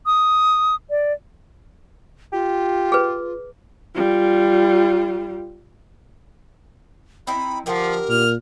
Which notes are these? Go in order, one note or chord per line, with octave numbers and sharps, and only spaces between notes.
D#6
D5
F4 G4
G#4 B4
G3 F4
C4 D#4 E4 B5
D3 F3 G4 A#4 F#5
A#2 F6